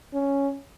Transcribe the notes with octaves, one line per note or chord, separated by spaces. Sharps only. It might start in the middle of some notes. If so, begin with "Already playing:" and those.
C#4